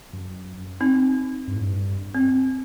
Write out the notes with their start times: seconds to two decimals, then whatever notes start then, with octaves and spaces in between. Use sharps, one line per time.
0.13 F#2
0.80 C4 D#4
1.48 G2
1.55 A2
1.61 G2
2.15 C4